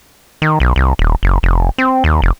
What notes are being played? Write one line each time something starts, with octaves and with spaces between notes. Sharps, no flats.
D#3
B1
C2
D#1
F#1
F1
C4
D#2
F1